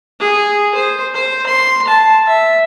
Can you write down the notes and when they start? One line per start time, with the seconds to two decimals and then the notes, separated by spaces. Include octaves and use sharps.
0.20 G#4
0.75 C5
1.15 C5
1.47 C6
1.88 A5
2.27 E5